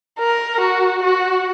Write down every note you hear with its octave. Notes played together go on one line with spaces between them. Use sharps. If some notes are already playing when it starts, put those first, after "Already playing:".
A#4
F#4
F#4